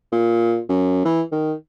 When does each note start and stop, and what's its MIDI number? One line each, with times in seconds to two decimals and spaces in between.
0.12 0.60 46
0.69 1.04 42
1.05 1.22 52
1.32 1.53 51